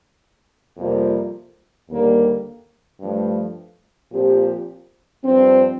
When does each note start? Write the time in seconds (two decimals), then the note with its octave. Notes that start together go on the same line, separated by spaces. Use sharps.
0.77 F2 C3 G3 A#3 F4
1.89 D#2 D3 G3 A#3
3.00 G2 F3 A3
4.12 A#2 F3 C4 G4
5.23 G2 F3 C4